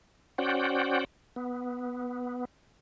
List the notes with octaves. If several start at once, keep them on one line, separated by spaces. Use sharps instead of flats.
C#4 F#4 C5 D5 F#5 G5
B3